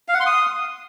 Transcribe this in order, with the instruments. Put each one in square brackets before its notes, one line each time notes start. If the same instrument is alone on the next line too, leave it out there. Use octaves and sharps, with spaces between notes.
[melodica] F5
F#5
C6
D#6